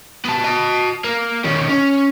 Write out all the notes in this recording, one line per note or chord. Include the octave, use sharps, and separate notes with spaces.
B3 A5
D#5 A5
A#3
D#3 C#4
C#4